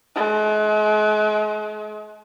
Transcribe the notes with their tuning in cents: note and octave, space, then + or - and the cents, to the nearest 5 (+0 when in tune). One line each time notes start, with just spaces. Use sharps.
G#3 +40